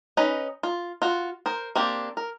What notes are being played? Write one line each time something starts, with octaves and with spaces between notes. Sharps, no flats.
C#4 D#4 B4 D#5
F4
F4 F#4
A#4 C5
A#3 C4 D4 G4
A#4